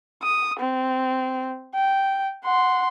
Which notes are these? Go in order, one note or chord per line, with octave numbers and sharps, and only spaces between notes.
D#6
C4
G5
F#5 C6